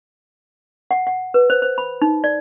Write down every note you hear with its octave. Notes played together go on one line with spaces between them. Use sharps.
F#5
F#5
B4
C5
C5
B5
D#4
D5